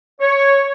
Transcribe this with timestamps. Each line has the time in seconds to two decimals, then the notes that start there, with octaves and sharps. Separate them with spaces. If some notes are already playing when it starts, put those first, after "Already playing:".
0.21 C#5